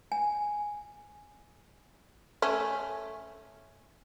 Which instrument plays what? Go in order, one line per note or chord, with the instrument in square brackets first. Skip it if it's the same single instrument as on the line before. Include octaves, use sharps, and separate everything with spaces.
[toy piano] G#5
[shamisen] A3 C#4